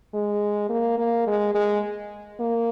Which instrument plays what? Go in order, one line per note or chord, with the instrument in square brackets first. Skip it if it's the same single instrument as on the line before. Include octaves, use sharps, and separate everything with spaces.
[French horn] G#3
A#3
A#3
G#3
G#3
A#3